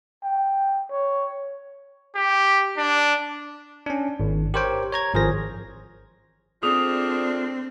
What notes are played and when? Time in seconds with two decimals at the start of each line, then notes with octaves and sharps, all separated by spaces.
0.24 G5
0.91 C#5
2.15 G4
2.77 D4
3.86 C#4 D4
4.20 G#1
4.54 G4 A#4 C5 C#5 G5
4.92 C#5 A#5 G#6
5.14 G#1 F3 G#4 A#4 C5 A#6
6.63 F3 A3 C4 D4 G#4 D#6 F7